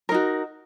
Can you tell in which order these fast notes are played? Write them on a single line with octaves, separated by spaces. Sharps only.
A#4 D#4 F#4